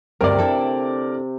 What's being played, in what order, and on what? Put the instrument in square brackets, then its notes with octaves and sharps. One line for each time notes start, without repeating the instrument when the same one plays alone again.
[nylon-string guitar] D2 G2 [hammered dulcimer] C3 [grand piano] A#4 D5
[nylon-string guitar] D4 E4 A4